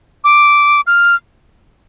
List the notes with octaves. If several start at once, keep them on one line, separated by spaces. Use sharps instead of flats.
D6
F6